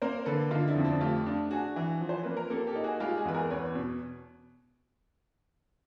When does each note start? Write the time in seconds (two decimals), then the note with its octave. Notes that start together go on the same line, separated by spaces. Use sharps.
0.02 A#3 A#4 C5
0.26 D3 A4 B4
0.51 D3 D#4 F4
0.68 D4 E4
0.76 F2
0.84 C4 D4
1.01 A3 F4 G4
1.26 D4
1.51 D4 F#4 G#4
1.76 E3
2.01 F3
2.09 C5
2.23 A#3 B4
2.37 A#4
2.50 A#3 G4 A4
2.67 G4 A4
2.76 D#4
2.84 F#4 G#4
3.00 G#3 F4 G4
3.17 F#4 G#4
3.25 E2 B4
3.34 G#4 A#4
3.50 E2 B4 C#5
3.75 B2